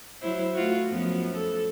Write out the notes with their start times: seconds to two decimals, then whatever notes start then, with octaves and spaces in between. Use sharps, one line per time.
0.21 F#3 E4 C5
0.54 A3 F4 F#4
0.88 F#2 F3 B3
1.36 A4